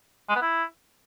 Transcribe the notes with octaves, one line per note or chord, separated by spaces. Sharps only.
G#3
B3
E4